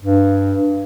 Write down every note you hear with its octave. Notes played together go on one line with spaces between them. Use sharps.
G2